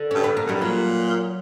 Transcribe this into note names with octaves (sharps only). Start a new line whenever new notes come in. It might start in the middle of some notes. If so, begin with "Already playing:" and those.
Already playing: D3
G2 C#4
B3
A#3
F#2 G3
G2
A#2 F#3